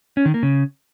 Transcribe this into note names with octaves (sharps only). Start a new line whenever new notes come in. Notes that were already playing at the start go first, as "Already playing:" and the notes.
C#4
D#3
A#3
C#3